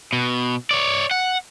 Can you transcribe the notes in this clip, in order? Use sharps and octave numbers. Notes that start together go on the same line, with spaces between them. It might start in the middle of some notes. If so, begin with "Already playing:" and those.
B2
C#5 D5
F#5